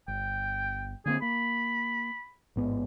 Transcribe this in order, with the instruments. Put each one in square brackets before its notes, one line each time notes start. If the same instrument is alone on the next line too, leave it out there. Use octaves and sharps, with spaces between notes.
[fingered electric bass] G1 [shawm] G5
[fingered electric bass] D3 A#3 C4 [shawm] G#4
[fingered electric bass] A#3 [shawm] B5
[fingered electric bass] A1 G#2 B3